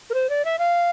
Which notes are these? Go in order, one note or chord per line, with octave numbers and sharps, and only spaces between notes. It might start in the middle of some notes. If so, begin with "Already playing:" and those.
A#4
C5
D5
E5
F5